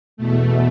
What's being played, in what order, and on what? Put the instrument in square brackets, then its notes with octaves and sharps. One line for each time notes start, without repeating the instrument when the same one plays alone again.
[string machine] E2 B2 A3